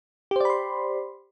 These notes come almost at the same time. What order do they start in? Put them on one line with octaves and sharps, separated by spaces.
G4 C5 D5 B5 C6